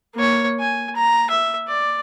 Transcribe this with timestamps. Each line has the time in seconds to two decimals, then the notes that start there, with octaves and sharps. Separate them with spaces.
0.15 A#3 C#5
0.59 G#5
0.95 A#5
1.30 E5
1.68 D5